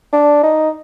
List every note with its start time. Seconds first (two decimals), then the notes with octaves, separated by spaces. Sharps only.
0.13 D4
0.44 D#4